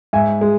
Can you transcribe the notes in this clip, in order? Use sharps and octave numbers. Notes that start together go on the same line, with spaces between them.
G#2 E5 G#5
G#3